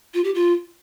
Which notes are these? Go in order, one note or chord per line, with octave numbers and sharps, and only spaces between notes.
F4
G4
F4